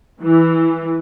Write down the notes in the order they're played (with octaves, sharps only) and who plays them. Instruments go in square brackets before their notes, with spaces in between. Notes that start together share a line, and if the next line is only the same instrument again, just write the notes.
[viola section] E3